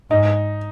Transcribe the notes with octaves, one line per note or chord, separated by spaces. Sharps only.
G#2 D#4